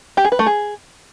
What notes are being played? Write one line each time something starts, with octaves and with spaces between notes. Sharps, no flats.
G4
G#4
B4
A3
G#4